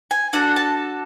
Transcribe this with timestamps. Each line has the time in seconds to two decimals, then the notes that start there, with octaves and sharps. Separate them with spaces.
0.11 G#5
0.33 D4 F#4 A4 F#5
0.56 A5